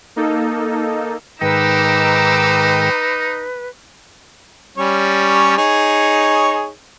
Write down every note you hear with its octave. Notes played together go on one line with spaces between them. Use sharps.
A#3 D#4 A4
G#2 D#3 D#4 B4 G5 A#5 D6 E6
G3 C#4 C#5
D#4 G#4 C#5